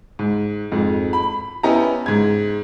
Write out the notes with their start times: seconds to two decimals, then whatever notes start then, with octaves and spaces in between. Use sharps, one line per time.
0.19 G#2
0.72 F2 G#2
1.13 B5
1.63 B3 C#4 E4 G4 D#5 A#5
2.06 G#2 G#6